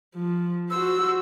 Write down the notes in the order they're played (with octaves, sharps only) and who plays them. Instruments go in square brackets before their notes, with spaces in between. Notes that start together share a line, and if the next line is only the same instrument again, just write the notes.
[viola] F3
[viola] F#4 C5 [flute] E6